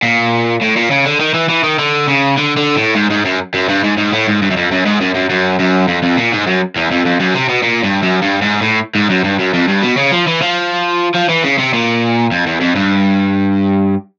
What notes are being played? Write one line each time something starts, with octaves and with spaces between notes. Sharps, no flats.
A#2
A2
A#2
C#3
D3
D#3
E3
E3
D#3
D3
C#3
D3
D3
A2
G#2
G#2
F#2
F#2
G2
G#2
G#2
A2
G#2
G2
F#2
F2
F#2
G#2
F#2
F#2
F#2
F#2
F2
F2
A#2
G#2
F#2
E2
F2
F2
F#2
C3
B2
A#2
G2
F#2
G2
G#2
A2
G#2
F#2
G2
F#2
F2
G2
B2
C#3
F3
E3
F3
F3
E3
C#3
C3
A#2
F2
E2
F2
G2